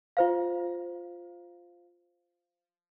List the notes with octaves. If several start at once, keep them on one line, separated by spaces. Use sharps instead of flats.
F4 C5 F5